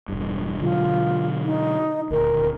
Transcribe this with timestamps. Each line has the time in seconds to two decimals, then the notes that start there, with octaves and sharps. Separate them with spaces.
0.09 E1 G2
0.62 B2 D3 F#3 F4
1.45 D#4
2.10 D#1 G#1 D2 A#4